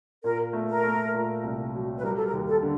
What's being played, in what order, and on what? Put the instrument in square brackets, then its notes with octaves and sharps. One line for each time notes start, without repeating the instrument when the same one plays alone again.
[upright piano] A#2 [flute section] A#4
[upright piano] A3
[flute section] A#4
[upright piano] A3
A#2
C2
F#3
[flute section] B4
[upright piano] G3 [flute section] A#4
[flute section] A4
A#4
[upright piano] D#2
[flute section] A4
[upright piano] D3